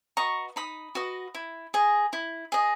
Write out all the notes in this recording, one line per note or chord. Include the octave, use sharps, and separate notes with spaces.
F#4 B4 D#5 A#5 C#6
D#4 B5 D#6
F#4 B4 D#5
E4
G#4 D#5
E4
G#4 D#5